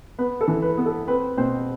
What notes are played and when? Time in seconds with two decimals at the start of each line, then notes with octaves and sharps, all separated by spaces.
0.19 B3 B4
0.41 A4
0.48 E3
0.62 B4
0.77 B3
0.86 A4
1.07 C4 B4
1.37 B2 C4 C5